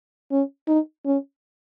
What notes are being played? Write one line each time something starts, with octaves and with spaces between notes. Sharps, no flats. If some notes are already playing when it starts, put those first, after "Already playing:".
C#4
D#4
C#4